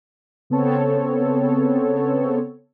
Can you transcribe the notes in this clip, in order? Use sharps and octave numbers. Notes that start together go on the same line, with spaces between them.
C#3 B3 C4 A4 C#5